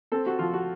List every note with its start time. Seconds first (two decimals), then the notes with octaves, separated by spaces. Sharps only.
0.12 C4 A4
0.26 F#4
0.39 F3 F4
0.53 F#4